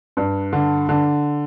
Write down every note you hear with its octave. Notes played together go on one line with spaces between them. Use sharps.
G2
D3
D3